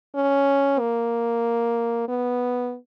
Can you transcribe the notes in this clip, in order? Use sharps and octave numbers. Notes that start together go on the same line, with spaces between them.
C#4
A#3
B3